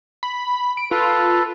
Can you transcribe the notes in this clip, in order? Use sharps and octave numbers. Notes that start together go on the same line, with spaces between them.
B5
D7
F4 A4 B4